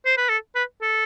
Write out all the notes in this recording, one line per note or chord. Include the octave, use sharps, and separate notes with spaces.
C5
B4
A4
B4
A4